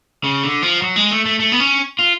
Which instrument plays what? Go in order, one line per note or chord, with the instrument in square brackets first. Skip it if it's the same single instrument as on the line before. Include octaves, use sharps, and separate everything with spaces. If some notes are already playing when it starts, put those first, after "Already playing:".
[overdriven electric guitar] C#3
D3
F3
F#3
G#3
A3
A3
A3
B3
C#4
F4